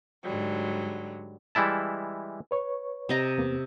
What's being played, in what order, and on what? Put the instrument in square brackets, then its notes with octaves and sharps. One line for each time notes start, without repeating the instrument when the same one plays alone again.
[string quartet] G#2 D3 F#3 G3
[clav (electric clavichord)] E3 G3 G#3 E4 A5
[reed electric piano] B4 C#5 C#6
[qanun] C3 D#5 A#5
[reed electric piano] E2 A#3 B3